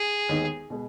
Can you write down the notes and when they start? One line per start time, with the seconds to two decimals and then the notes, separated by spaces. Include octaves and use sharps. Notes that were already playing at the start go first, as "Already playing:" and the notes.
Already playing: G#4
0.29 D#2 D#3 G#3 B3 D#4
0.70 B2 G#3